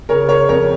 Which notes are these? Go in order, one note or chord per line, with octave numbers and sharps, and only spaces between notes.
C#3 A#4 C#5
A#4 C#5
F2 A#4 C#5